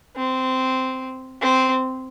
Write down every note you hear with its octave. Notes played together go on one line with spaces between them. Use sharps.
C4
C4